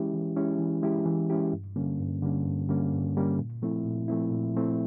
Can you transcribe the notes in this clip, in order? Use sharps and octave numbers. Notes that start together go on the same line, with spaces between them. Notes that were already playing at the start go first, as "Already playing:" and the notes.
Already playing: E3 G#3 C#4 E4 G4
E3
G#3 C#4 E4 G4
E3
G#3 C#4 E4 G4
E3
G#3 C#4 E4 G4
G2
D3 G3 A#3 C#4
G2
D3 G3 A#3 C#4
G2
D3 G3 A#3 C#4
G2
D3 G3 A#3 C#4
A#2
F3 A3 C4 E4
A#2
F3 A3 C4 E4
A#2
F3 A3 C4 E4